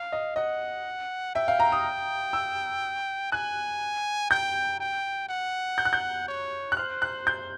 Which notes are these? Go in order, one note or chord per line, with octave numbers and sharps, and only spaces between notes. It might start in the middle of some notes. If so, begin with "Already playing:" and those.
Already playing: F5
D#5
D#5 F#5
E5 G5
F5
A#5
D#6
E6
G#5 F#6
G5 G6
G5
F#5
G6
F#6
G6
C#5
F#6
C5 F6
F#6
G6